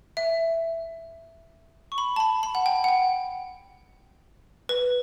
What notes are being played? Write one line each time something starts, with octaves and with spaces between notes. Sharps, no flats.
E5
C#6
B5
A5
B5
B5
F#5
G5
F#5
G5
B4